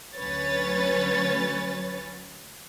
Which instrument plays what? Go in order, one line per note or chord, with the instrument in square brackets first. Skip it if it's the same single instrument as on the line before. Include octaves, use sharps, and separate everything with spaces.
[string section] D2 F#3 C#4 B4 C#5 A6